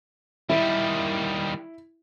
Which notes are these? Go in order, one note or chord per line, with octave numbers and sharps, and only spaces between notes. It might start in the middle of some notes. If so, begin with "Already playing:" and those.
D#3 G3 E4